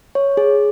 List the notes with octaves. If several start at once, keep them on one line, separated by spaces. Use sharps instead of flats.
C#5
G#4